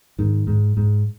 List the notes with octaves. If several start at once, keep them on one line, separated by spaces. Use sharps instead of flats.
G#2 D#3
G#2
G#2